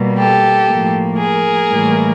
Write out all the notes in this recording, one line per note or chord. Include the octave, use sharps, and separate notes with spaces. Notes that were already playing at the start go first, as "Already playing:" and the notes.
Already playing: B2 G3 A#3
G4 A4
A2 F3 A#3
G#4 A#4
A2 E3 G3 A#3